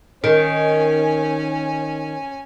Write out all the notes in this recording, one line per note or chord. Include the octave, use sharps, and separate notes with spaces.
D#3 C#4 G#5